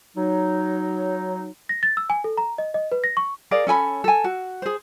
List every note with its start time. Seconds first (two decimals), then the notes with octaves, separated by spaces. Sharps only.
0.17 F#3 D#4
1.69 A#6
1.83 A6
1.97 E6
2.10 G#5
2.24 A4
2.37 A#5
2.58 D#5
2.74 D#5
2.92 B4
3.04 A#6
3.17 C#6
3.51 G#4 A#4 D5 F5
3.67 C#4 A4 G#5 B5
4.04 A4 G#5
4.24 F#4
4.62 G#4 C5